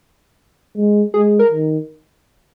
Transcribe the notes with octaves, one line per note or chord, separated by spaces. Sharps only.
G#3
G#3 G#4
A#4
D#3